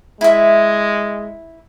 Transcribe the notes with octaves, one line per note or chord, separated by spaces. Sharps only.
G#3 E4 E5